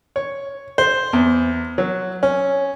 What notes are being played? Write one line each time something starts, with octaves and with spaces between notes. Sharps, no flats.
C#5
C5
E2
F#3
C#4